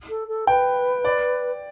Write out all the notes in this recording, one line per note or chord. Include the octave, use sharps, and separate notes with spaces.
A4
A4
B4 G5
D5